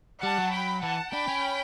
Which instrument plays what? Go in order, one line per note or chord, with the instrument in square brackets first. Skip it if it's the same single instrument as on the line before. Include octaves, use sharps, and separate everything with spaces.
[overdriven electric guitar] G3 [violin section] F#5 A5
[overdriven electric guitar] F#3
[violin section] G5 B5
[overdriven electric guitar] E3 [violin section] F#5 A5
[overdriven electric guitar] D4 [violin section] G5 B5
[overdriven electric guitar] C#4